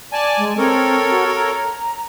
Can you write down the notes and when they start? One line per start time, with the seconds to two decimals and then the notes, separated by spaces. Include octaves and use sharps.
0.13 D5 G#5 A5
0.38 G#3
0.58 C4 A4 A#4 C#5
1.10 F#4
1.29 A#5